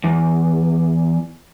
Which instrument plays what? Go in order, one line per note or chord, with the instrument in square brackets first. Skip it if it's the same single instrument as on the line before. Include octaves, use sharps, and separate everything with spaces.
[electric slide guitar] E2